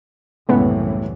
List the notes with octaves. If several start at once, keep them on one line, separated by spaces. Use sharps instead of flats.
C2 F#2 A2 C#3 E3 G#3 B3